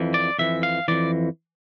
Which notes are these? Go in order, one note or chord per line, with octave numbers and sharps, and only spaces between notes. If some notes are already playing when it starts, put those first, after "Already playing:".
Already playing: F2 E3
D5
F2 E3 E5
F5
F2 E3 D5